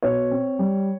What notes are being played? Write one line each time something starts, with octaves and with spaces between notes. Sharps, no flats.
B2 C#5
C4
G3